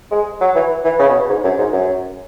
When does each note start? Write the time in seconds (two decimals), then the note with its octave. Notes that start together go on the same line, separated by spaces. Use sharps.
0.11 G#3
0.41 F#3
0.55 E3
0.84 E3
0.99 C#3
1.09 B2
1.29 G#2
1.44 F#2
1.58 G#2
1.73 F#2